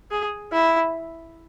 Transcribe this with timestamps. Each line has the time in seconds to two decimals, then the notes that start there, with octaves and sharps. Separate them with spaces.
0.11 G#4
0.53 E4